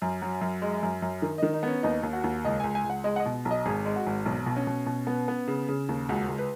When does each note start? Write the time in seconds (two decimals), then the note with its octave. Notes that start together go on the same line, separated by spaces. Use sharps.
0.02 F#2
0.22 F#3
0.41 F#2
0.62 G#3
0.83 F#2
1.02 F#2
1.22 D#3
1.38 D#3 D#5
1.53 D#4
1.63 B3 C#4
1.83 D#2 D#4
2.03 D#2
2.13 F#4
2.24 D#2
2.44 C#2 D#5
2.60 C#2 G#5
2.75 G#5
2.84 C#2
2.90 F#5
3.04 G#3 D#5
3.16 F#5
3.20 D#5
3.26 B2
3.45 B1
3.51 D#5
3.66 G#1 G#4
3.86 G#3
3.96 F#4
4.07 G#1
4.26 B1
4.46 B2
4.56 C#4
4.67 B2
4.86 B2
5.07 B3
5.28 B3
5.48 C#3
5.68 C#3
5.89 D#2
6.09 C#2 F#4
6.28 C#2
6.38 B4